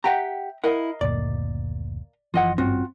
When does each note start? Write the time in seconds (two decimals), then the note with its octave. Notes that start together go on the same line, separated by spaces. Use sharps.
0.04 G4 E5 F#5 G5 A#5
0.64 E4 A#4 D#5 F5 F#5
1.01 F#1 D2 A#2 D5
2.34 F#1 E3 F3 F4 D#5 F#5
2.58 G#1 G2 C4 C#4 F4 F#4